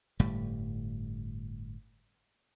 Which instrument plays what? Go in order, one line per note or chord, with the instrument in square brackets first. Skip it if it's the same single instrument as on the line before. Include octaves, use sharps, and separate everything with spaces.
[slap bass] G1 A2 G3